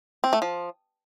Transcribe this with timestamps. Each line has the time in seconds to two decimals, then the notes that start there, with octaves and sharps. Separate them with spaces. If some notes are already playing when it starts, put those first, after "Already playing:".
0.24 C4
0.33 A3
0.42 F3